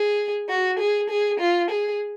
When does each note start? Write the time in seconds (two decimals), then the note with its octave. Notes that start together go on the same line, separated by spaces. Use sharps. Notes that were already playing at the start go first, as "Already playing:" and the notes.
Already playing: G#4
0.49 F#4
0.79 G#4
1.10 G#4
1.40 F4
1.70 G#4